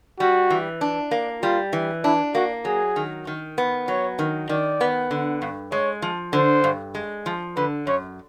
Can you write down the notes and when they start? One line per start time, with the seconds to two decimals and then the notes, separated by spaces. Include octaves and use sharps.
0.20 G3 F#4
0.50 E3
0.81 D4
1.11 A#3
1.42 G3 F4
1.73 E3
2.04 D4 E4
2.35 A#3 F#4
2.65 F#3 G#4
2.96 D#3
3.27 D#3
3.58 B3
3.88 F#3 C#5
4.19 D#3
4.49 D#3 D5
4.81 B3
5.11 D3
5.42 G2
5.72 G#3 C#5
6.02 F3
6.33 D3 C5
6.64 G2
6.95 G#3
7.26 F3
7.56 D3 B4
7.87 F#2 C#5